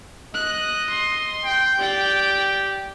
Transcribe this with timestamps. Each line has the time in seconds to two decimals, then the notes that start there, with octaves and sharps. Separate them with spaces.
0.34 D#5 F#6
0.90 C6
1.44 G5
1.79 G4 D5 G5